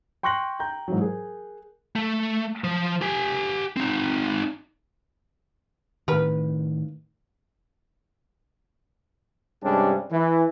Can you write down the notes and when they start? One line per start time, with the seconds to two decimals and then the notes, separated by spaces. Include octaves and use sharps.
0.23 G5 C6 C#6 F#6 A#6 F#7
0.59 G5 A#5 G6
0.88 G#2 E3 F#3
1.01 G#4 A#4
1.96 A3
2.64 F3
3.02 G4 G#5
3.77 C4 D#4
6.08 A2 D#3 A#4 B4
9.63 G2 C3 G3 G#3 C#4 D4
10.12 E3